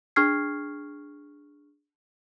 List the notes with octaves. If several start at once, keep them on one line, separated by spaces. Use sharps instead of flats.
D4 G#4 C#6 F6 G#6 C7